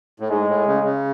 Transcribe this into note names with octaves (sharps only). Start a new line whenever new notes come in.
A2
G#2 G#3
A2
C#3
C#3